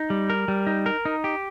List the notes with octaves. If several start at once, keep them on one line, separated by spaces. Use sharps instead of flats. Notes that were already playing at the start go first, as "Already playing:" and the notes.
Already playing: D#4
G3
A#4
G3
D#4
A#4
D#4
G4